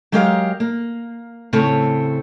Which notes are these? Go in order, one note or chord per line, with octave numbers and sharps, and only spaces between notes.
F#3 G#3 G4 A#4 C#5 F5
A#3
A2 C#3 A3 C4 C#5